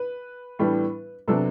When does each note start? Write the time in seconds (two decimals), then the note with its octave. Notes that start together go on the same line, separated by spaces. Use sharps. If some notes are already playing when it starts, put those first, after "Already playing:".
Already playing: B4
0.59 A2 E3 G3 B3 D4
1.28 C3 F#3 B3 D4 A4